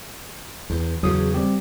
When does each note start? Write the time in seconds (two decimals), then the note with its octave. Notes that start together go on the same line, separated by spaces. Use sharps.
0.70 E2
1.03 E2 C#3 F#3 D#6
1.34 G3 C4 G4